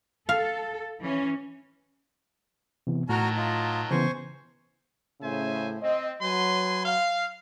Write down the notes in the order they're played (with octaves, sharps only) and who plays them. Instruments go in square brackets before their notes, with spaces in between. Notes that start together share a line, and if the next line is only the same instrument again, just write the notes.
[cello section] A4 [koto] F5
[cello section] E3 C#4
[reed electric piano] C3 E3 B3
[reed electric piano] A2 [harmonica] D#3 F#3 A5 [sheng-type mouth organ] F#4 A#5 F6
[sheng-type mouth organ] F4 D#5
[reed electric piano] C#3 E3 B3 [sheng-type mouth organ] C5 G#5 C#6
[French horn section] A2 C#3 [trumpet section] C5 E5 G#5
[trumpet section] C4 [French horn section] D#5
[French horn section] F#3 [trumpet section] B4 G#5 C6
[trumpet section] F5